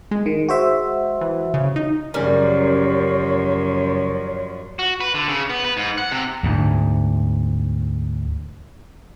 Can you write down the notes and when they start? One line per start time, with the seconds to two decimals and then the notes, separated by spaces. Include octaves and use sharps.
0.11 G#3
0.26 D#3
0.49 F#4 C5 E5
1.21 E3
1.54 C#3
1.76 D#4
2.14 F#2 C#3 F3 G3 C#4 A#4 C#5
4.79 F#4
5.00 B4
5.14 D3
5.28 C#3
5.50 B3
5.64 B4
5.77 G#2
5.98 F#5
6.12 C3
6.43 D2 G#2